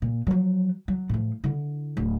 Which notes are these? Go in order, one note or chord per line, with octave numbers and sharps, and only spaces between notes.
A#2
F3 F#3
F#3
A2 F3
D3 E4
D1